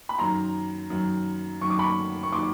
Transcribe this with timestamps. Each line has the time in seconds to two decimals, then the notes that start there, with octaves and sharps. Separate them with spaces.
0.09 B5
0.18 F#2 D#3 F#3 A#5 C6
0.90 F#2 D#3 F#3
1.61 F#2 D#3 F#3 C#6
1.70 D6
1.79 B5 C#6
2.23 C#6
2.33 D#3 F#3 C6 D6